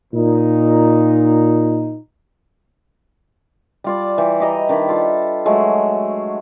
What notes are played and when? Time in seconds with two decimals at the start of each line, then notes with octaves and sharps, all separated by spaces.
0.14 A#2 D#4
3.84 G3 F4 D5
4.18 E3 G4
4.40 G4 D#5 A#5
4.69 D#3 D4 E4 B5
4.89 F4 A4
5.45 F#3 G#3 A3